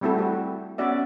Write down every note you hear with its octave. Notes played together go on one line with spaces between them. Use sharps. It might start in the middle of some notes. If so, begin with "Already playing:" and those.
G3 A3 C4 E4 F#4 A4
F#4 G4
B3 C#4 F#4 D5 E5